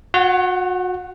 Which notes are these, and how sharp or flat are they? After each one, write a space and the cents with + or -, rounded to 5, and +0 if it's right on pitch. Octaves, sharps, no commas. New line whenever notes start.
F#4 -35 F#5 +15